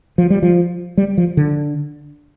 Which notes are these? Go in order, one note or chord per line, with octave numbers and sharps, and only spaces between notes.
F3
G3
F3
G3
F3
D3